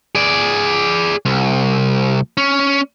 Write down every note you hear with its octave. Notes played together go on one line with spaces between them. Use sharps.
G#4 D5
C2
C#4